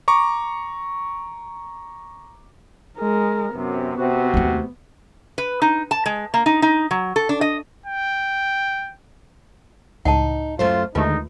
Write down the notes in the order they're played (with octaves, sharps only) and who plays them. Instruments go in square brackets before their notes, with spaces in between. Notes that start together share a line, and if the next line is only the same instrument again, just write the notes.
[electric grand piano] A#5 C#6 D6
[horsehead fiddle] G#3 A#4
[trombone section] F#2 C3 [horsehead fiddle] B3
[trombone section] C3 F#4
[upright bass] D#2 A3
[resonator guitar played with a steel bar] B4
D#4
A5
G#3
A#3
D#4
D#4
F#3
A4
D4
D#5
[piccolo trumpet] G5
[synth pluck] C#2 A2 [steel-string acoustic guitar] D#4 [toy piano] F#5 A5
[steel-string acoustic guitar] F#2 A3 C5 [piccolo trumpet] F4
[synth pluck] D#2 A3 [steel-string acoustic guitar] D3 D#3 G#3 [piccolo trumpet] D#4 [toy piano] F4 B4